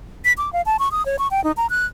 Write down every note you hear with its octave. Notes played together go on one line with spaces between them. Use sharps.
B6
D6
F5
A5
C#6
D#6
C#5
C#6
G5
D#4
A#5
F#6